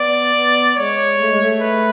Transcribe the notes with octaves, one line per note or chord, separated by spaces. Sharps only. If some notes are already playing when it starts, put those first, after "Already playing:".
Already playing: B3 D5
B3
G#3 C#5
A3
G#3
A3
B4